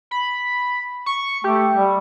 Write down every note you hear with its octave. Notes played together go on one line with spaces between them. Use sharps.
B5
C#6
A3 G4
G3